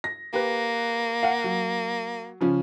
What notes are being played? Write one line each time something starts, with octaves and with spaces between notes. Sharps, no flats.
A#6
A#3 G4 B4
F5 F#5
F#3
C#3 F3 C#4